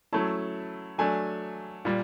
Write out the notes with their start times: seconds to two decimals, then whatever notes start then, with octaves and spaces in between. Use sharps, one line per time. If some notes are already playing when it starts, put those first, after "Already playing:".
0.13 F#3 A3 C#4 E4 A5
0.98 F#3 A3 D4 G#5
1.85 A#2 G3